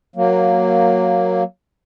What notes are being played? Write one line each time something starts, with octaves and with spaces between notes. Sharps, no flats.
F#3 A#3